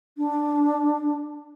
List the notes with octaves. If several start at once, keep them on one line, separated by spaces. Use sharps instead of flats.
D4